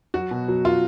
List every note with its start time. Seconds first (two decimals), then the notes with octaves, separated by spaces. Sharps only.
0.14 F#3 F#4
0.31 B2
0.48 F#3
0.65 F4